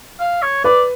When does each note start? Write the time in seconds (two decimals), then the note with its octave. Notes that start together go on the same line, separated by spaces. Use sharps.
0.20 F5
0.42 C#5
0.64 B4 D5